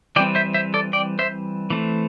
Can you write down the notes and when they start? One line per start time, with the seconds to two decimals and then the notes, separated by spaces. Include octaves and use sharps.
0.16 E3 G3 C4 D5 G5
0.35 C5 E5
0.54 C5 E5
0.74 A4 D5
0.93 D5 G5
1.19 C5 E5
1.70 E3 A3 C4